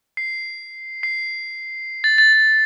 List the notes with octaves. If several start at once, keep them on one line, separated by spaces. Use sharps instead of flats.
C7
C7
A6
A6
A6